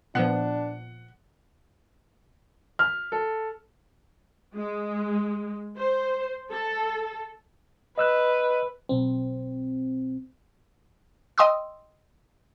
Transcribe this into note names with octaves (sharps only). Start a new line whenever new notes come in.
A#2 F3 B3 D4 F#5
F6
A4
G#3
C5
A4
B4 D#5 E6 F#6
B1 C4
D#5 G5 C6 D#6 E6